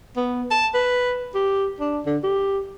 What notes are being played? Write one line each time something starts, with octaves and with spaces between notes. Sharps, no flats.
B3
A5
B4
G4
D4
D3
G4